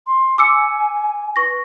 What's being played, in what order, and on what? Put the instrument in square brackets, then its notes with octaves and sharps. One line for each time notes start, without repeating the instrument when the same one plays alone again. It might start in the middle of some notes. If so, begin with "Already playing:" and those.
[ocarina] C6
[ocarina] G#5 [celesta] D6 E6 C#7
[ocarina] B4 [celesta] C#6 A#6